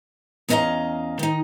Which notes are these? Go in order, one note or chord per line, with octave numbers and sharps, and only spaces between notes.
E2 B3 C#4 D#5 F5 A#5
D#3 D#4